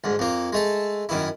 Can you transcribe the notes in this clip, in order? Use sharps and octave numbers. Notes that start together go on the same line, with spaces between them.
D2 G#2
F2 A#3
G#3 A3 A4
F#2 D#3 E4